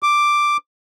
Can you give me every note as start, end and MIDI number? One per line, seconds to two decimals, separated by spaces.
0.03 0.57 86